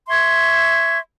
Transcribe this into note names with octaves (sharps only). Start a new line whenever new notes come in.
E5 C6 C#6 G#6